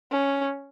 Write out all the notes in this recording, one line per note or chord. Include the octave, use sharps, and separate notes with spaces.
C#4